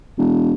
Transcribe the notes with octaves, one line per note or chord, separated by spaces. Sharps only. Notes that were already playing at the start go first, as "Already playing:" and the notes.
E1